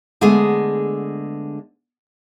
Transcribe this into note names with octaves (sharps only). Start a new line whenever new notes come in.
D3 G#3 A3 B3 G#4